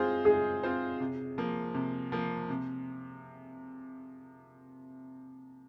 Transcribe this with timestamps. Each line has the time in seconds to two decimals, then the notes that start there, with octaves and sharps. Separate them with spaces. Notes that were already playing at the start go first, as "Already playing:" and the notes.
Already playing: G#3 C4 F4 G#4 C5
0.25 G#3 G#4
0.63 C4 F4 C5
1.00 C3
1.38 F3 A#3
1.74 C3
2.12 F3 A#3
2.50 C3